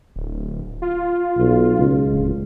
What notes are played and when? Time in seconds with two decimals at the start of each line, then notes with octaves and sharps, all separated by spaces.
0.16 D1
0.82 F4
1.38 B1
1.78 C#2
2.14 D1